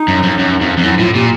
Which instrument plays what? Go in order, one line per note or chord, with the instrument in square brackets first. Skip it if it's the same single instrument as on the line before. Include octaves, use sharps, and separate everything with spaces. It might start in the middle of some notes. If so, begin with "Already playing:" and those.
Already playing: [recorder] D#4
[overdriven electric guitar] F#2
F2
F#2
F2
F2
[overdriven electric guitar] F#2 [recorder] E4
[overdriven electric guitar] A2 [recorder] F4
[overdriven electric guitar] A#2 [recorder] G4